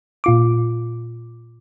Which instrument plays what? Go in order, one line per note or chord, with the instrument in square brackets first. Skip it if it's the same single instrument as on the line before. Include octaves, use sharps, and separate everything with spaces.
[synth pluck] A#2 F4 D6